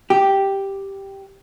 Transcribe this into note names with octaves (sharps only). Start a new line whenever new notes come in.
G4